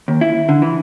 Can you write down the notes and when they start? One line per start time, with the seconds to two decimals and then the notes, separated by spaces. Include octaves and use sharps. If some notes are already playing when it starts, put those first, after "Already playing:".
0.08 D#2
0.21 E4
0.49 D3
0.62 E3